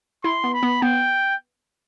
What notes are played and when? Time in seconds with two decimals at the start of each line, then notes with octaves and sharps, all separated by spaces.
0.24 E4 C6
0.44 B3
0.53 B5
0.63 B3
0.82 B3 G5